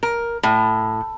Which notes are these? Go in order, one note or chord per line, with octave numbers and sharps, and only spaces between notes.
A#4
A2